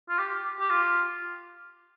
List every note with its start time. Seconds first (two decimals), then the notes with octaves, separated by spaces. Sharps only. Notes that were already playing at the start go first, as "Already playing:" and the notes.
0.09 F4
0.19 G4
0.60 G4
0.71 F4